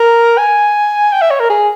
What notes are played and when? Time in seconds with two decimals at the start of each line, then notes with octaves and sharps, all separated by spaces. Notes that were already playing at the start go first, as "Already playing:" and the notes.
Already playing: A#4
0.38 G#5
1.13 G5
1.22 E5
1.30 C#5
1.40 A#4
1.50 G#4